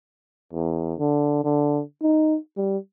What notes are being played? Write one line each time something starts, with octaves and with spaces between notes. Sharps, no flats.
E2
D3
D3
D#4
G3